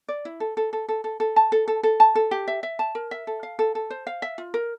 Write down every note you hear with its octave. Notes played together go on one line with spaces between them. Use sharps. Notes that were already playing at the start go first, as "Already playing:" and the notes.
D5
E4
A4
A4
A4
A4
A4
A4
A5
A4
A4
A4
A5
A4
G4
E5
E5
A5
A#4
E5
A4
F5
A4
A4
C5
F5
E5
F4
A#4